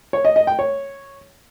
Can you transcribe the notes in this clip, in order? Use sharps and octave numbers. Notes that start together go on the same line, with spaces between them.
C#5
D#5
D#5
G5
C#5